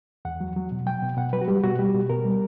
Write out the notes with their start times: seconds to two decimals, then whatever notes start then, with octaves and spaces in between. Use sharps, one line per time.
0.25 E2 F#5
0.41 F#3
0.56 F#3
0.72 B2
0.86 F#3 G5
1.02 B2
1.17 B2 F#5
1.33 F#3 B4
1.41 F#4
1.48 G3 G4
1.64 B2 F#4
1.79 G3 G4
1.94 B2
2.10 B2 A#4
2.25 G3